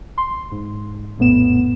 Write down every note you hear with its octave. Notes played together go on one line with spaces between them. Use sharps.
C6
G#2
A#1 F2 A2 B3 E7